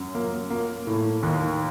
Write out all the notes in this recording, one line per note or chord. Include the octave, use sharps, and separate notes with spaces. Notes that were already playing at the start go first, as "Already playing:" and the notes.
Already playing: F#2
A#3
A#3
A2
D#2